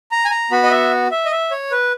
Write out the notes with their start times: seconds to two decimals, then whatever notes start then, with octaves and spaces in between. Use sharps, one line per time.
0.11 A#5
0.25 G#5
0.31 A#5
0.51 B3 F#4 B5
0.63 D#5
0.71 E5
1.11 E5
1.25 D#5
1.31 E5
1.51 C#5
1.71 B4